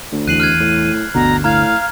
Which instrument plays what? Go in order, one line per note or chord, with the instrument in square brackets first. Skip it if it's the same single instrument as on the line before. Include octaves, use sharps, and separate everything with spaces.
[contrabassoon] D2
[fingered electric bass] E2 E3 [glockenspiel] F#6 C7 F#7 [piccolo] D#7
[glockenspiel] F6 F#6 G#6
[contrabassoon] A2
[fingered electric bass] G1 D2 D3 [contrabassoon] B2 [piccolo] A#5
[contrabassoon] A2 [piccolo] F5 [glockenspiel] A#5 F6 G#6